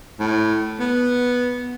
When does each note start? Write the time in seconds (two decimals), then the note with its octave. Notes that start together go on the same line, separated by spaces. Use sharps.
0.19 A2
0.79 B3